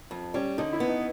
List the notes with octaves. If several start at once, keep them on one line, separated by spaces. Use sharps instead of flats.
F2
G3 C#4
D3 D#4
E4
B3
D#4